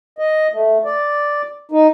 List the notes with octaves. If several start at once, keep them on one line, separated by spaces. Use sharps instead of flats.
D#5
A3
D5
D#4